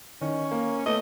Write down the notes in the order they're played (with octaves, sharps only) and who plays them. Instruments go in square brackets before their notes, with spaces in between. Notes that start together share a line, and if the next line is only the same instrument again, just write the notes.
[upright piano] D#3 [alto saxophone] C#4
[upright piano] A#3
[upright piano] A3 B3 [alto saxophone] D#5